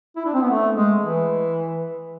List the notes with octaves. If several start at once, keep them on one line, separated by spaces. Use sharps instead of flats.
E4
D4
C4
B3
A3
G#3
E3